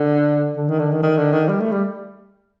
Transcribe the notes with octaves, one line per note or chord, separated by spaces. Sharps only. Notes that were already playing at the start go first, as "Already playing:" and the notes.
Already playing: D3
D3
D#3
D3
D#3
D#3
D3
D#3
G3
A3
G3